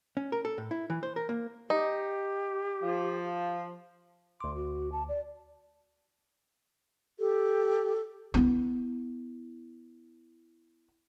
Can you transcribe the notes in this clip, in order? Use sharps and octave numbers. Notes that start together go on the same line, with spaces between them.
C#4
A#4
A4
A2
E4
E3
C5
A#4
A#3
D#4 G4
F3
D2 C6 D6
F#4
A5
D5
G4 A4
B3 E4